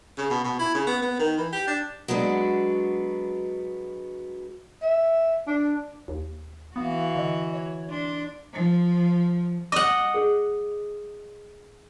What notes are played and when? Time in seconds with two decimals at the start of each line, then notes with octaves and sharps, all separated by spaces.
0.18 C#3
0.30 B2
0.44 B2
0.59 E4
0.75 C#3
0.87 B3
1.02 B3
1.19 D#3
1.37 E3
1.53 G4
1.67 D4
2.08 F#3 G#3 B3 D4 F#4
4.82 E5
5.47 D4
6.08 D#2
6.76 E3 B3 F#4 F5
7.16 D3 D#5
7.52 C#5
7.90 D4 C6
8.53 F3
9.72 D#5 F#5 D6
10.14 G#4